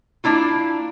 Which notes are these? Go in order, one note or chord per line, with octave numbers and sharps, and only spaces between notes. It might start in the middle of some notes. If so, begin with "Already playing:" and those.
A#3 D4 E4 F4